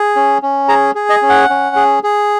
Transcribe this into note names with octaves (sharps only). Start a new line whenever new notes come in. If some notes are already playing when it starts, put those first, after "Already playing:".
Already playing: G#4
C#4
C#4
G#4 A#5
G#4
D#5
C#4
F#5
C#4
G#4
G#4